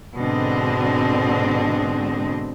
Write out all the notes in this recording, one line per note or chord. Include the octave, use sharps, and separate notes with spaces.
G#2 B2 D3 C4 D4 D#5